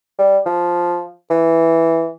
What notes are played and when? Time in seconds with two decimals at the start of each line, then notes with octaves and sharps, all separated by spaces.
0.19 G3
0.46 F3
1.30 E3